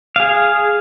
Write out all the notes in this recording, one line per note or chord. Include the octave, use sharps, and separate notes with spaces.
G#4 F5